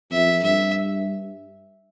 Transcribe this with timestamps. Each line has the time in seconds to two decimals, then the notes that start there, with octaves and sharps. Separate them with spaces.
0.11 F2 E5
0.43 G2 E5